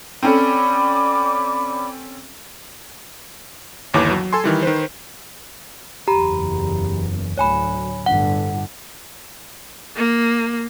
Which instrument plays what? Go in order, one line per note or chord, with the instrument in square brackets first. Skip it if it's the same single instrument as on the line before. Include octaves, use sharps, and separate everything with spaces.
[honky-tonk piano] C4 C#4 A4 [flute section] D5 B5 D6
[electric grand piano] G1 D#2 E3 C#5 D6
F#3
A4 G#5 C6
D#3 E3 G3
D#3 B4 C5
[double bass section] F#1 E2 [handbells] G4 A#5 B5
[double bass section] D2 A2 F#3 [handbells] C#5 G#5 B5
[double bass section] G1 A2 D3 [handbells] F#5
[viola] A#3